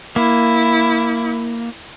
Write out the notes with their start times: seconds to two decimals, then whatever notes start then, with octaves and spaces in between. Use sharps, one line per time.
0.16 A#3 E4